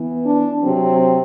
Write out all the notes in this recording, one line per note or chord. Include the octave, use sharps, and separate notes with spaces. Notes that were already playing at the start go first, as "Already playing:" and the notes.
Already playing: E3 B3
D4
C3 F#3 C4